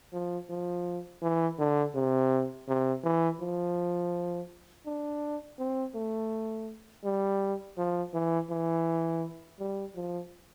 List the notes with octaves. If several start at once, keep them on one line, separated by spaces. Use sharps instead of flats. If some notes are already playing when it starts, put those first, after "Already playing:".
F3
F3
E3
D3
C3
C3
E3
F3
D4
C4
A3
G3
F3
E3
E3
G3
F3